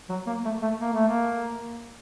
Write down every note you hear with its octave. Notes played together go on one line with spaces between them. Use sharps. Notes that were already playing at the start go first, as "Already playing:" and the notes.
F#3
A#3
A3
A3
A#3
A3
A#3